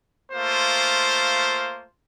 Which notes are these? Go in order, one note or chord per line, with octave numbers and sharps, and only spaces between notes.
A3 A#3 F4 C5